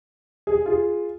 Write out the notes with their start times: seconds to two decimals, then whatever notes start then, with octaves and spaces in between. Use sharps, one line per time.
0.47 G#4
0.66 F4 G#4